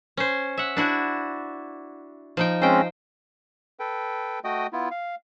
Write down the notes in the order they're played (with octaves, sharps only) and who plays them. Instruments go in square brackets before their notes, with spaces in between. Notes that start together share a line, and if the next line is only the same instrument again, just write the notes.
[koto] C#4 C5
E5 F#5
D4 E4 F#4
F3 D#4 G5
[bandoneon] G#3 C4 C#4 [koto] C5 G5
[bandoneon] A4 B4 G5
A3 F#4 D#5 G5 D#6
B3 E4 F4
F5